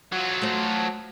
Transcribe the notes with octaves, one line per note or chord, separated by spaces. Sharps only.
F#3 F4
A3 C5